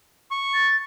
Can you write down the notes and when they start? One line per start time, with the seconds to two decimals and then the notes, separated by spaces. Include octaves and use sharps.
0.31 C#6
0.54 A6